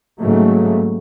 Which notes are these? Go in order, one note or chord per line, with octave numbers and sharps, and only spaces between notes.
G#2 C#3 F#3 A3 A#3